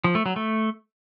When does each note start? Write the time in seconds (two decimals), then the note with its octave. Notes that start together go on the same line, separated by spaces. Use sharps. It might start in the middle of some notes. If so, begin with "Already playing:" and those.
0.04 F3
0.15 A3
0.26 F#3
0.36 A3